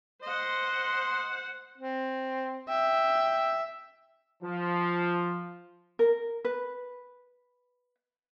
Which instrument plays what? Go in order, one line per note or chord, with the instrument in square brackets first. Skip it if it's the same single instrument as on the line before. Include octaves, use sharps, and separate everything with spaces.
[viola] C5 F#5 [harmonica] D#5 C6
[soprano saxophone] C4
[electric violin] E5 [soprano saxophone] G5
[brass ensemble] F3
[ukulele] A#4
B4